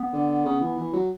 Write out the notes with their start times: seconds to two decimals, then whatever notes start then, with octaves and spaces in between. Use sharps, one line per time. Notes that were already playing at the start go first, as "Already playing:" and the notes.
Already playing: B3
0.13 D3
0.45 C#3
0.61 E3
0.77 E3
0.93 F#3